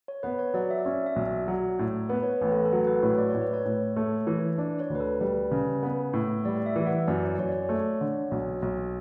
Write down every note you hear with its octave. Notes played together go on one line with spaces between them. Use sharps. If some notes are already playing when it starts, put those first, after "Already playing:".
C#5
B3 B4
C#5
F#3 D5
E5
D5
C#4 E5
E5
B1
D5
F#3
A2
B3 B4
C#5
B4
A1
B4
A4
A4
F#3 B4
B4
A2 C#5
D5
A2 C#5
B4
C#5
A2
A3
E3
D4 D5
C#5
D2
B4
A4
G3 B4
C#3
B3
A2
G3 D5
D5
E5
E3
F#5
F#2 D5
C#5
F#2 C#5
D5
A3 C#5
D3
B1
B1